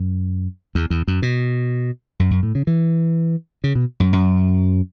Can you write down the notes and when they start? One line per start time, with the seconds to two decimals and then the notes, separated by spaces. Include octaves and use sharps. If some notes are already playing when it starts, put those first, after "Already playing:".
Already playing: F#2
0.75 E2
0.90 E2
1.08 F#2
1.22 B2
2.20 F#2
2.31 F#2
2.43 A2
2.55 C#3
2.67 E3
3.64 C#3
3.75 B2
4.00 F#2
4.13 F#2